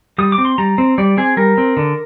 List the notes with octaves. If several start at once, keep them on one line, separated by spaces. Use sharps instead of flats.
G3 D#6
D6
C4
C6
G3 A#5
C4
G3 D5
C4 G#4
G3 A#4
C4
D3